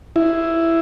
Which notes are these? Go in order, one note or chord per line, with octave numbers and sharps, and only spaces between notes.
E4